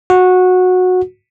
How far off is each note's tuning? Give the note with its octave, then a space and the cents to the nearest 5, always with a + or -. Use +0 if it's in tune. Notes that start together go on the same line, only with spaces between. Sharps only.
F#4 -15